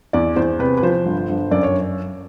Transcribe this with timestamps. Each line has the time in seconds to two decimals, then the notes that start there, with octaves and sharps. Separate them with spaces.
0.13 E2 D5
0.36 E2 C5
0.59 C3 B4
0.78 B4
0.83 F3 C5
1.05 G1
1.29 G1
1.51 F#2 D5
1.63 C#5